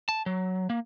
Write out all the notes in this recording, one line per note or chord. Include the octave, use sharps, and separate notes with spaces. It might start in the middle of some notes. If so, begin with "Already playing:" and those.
A5
F#3
A#3